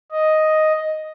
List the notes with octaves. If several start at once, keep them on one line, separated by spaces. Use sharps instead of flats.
D#5